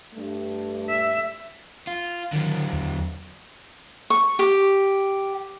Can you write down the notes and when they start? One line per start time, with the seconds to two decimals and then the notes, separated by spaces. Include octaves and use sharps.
0.14 G2 A3
0.90 E5
1.87 F4
2.32 D3 D#3 F#3
2.73 E2
4.10 C#6
4.39 G4